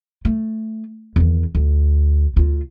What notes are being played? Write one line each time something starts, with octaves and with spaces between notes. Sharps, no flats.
A3
E2 D#3
D2
D2 F4